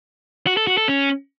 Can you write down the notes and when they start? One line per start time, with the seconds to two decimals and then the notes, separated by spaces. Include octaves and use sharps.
0.47 F#4
0.57 A4
0.67 F#4
0.77 A4
0.88 C#4